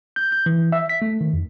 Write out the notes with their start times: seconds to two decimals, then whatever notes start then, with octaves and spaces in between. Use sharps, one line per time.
0.16 G6
0.32 G6
0.46 E3
0.72 E5
0.89 B6
1.02 A3
1.21 D#3
1.33 F2